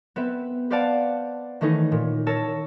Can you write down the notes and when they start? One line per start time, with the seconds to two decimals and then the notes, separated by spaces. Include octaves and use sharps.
0.16 B3 C4 B4 E5
0.70 B4 C5 D5 F5 F#5 A5
1.61 D#3 E3 A3 C#4 D#4
1.92 A#2
2.27 A#4 C#5 A5 C#6 E6